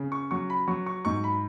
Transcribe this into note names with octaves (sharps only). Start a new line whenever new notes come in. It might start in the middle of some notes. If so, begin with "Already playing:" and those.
Already playing: C#3
C#6
F#3 C#6
B5
F#3 C#6
C#6
G#2 C#6
B5